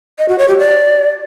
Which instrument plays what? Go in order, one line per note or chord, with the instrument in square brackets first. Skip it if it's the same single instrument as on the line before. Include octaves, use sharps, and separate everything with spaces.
[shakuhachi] D#5
F#4
C#5
G4
D5